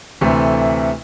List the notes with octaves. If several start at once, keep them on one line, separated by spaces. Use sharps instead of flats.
D2 C3 E3 A3